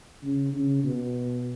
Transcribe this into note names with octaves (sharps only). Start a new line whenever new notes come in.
C#3
C#3
B2